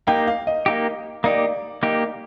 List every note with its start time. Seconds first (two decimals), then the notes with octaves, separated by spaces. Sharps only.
0.07 A#3 D#4 G4 G5
0.27 F5
0.47 D#5
0.66 A#3 D#4 G4
1.24 A#3 D#4 G4 D5
1.83 A#3 D#4 G4